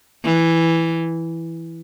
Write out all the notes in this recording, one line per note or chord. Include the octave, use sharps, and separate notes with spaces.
E3